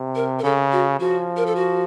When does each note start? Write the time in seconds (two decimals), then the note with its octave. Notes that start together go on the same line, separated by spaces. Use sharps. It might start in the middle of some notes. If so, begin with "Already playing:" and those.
Already playing: C3
0.15 A#4
0.39 A#4
0.44 C#3 A4
0.72 F#4
1.00 F3 F#4
1.37 A#4
1.46 A4
1.56 F#4